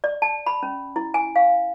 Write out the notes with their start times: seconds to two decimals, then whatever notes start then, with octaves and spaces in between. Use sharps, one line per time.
0.04 D5
0.22 A5
0.46 B5
0.63 C#4
0.96 E4
1.14 G#5
1.36 F5